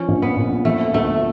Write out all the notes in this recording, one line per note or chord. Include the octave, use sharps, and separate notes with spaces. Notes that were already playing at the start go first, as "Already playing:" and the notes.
Already playing: F3 C#4
A#1
B3
A#2
F3 A3
D2 A3